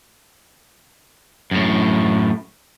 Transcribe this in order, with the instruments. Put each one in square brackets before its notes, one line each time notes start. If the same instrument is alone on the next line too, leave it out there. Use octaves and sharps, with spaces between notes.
[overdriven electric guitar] F#2 A2